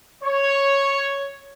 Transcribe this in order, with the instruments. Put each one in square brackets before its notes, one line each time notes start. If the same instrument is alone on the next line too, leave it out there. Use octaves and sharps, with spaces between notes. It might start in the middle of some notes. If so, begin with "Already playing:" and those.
[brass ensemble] C#5